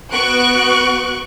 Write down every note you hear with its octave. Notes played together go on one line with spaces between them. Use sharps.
B3 F#4 C#6 F#6 D7